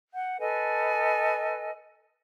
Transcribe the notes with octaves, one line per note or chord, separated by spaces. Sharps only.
F#5 G6
A4 B4 D#5 G#5